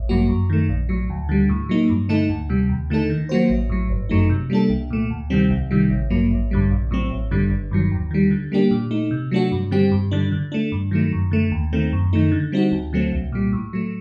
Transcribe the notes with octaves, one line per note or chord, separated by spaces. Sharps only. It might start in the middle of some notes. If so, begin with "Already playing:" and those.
Already playing: A1
G2 F#3 A#3 F#4
F#2
D#3 A3
A#1
A2 F#3
D2
D3 G3
A2
F#3 A#3 D#4
G2
D3 A3 D#4 A4
D2
C3 G3
D#2
D3 A3 D#4 A4
D#3
F#3 A#3 F#4 C5
A1
A2 F#3
G1
F#2 F#3 A3 D#4
C3
G3 A#3 D4 A4
C2
A#2 A3
D2
C3 D#3 G3 C4
C2
C3 D#3 G3
A1
G2 F#3 A#3
A1
G2 D3 G3
A#1
A2 F#3 C4
A1
G2 D3 G3
G1
G2 D#3 F#3
D#2
D#3 G3
D3
G3 A#3 D4 G4
A#2
A3 D#4
C3
F#3 A3 D4 F#4
G2
D3 G3 C4 G4
G2
D3 G3 D4
D3
A3 D4
G2
D#3 F#3 A3
F#2
D3 A3
D#2
D#3 A3 C4
F#2
D#3 A3 D#4
D3
G3 C4 D#4 F#4
D2
D3 F#3 A3 C4
C2
A#2 G3
A2
F#3 A3